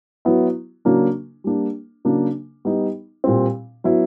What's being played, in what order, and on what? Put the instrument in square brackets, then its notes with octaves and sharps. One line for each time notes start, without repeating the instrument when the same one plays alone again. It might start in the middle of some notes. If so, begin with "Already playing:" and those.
[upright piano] F#3 B3 E4
C#3 F#3 A#3 D4
G3 A#3 D4
C#3 F#3 A#3 D4
G3 B3 D#4
A#2 G3 C4
F#3 B3 E4